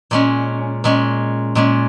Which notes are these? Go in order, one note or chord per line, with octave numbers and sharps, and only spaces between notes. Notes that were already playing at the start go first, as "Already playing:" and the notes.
A#2 G#3 C#4
A#2 G#3 C#4
A#2 G#3 C#4